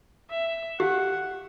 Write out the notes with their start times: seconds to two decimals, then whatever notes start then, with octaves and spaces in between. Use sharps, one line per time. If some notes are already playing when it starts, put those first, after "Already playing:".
0.31 E5
0.80 G4 F#5